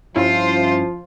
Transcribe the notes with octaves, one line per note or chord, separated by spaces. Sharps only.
G2 F3 C#4 E4 F4 C5